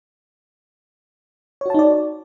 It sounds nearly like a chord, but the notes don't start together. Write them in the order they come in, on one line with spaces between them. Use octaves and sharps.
C#5 F#4 A5 D#4 D5